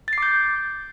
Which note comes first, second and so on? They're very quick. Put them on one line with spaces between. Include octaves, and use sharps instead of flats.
A6 C7 D6 G6